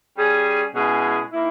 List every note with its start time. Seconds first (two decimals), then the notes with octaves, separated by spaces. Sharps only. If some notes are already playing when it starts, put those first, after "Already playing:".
0.17 G3 C#4 G#4
0.74 B2 G#3 C#4 E4 G#4
1.32 D#3 A#3 E4